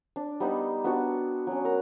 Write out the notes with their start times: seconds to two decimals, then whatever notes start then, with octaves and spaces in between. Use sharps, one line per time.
0.16 D4
0.40 G3 B3 D#4
0.84 B3 D4 F#4
1.47 F#3 C#4
1.65 A#4 F#5